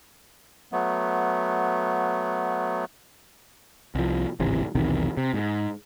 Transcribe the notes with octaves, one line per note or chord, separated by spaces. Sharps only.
F#3 A3 B3
C2 F3
D1 G#1 C3 E3
B1 E2 C3 D#3
C3
G#2